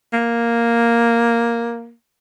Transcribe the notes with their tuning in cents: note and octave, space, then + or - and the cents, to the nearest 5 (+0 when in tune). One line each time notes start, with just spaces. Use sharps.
A#3 +0